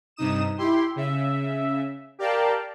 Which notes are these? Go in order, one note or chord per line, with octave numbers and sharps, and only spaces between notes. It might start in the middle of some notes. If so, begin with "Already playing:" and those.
G2 C3 D#4 D#6 E7
E4 G4 C6
C#3 E5
G4 A#4 D5 F5 G5 A5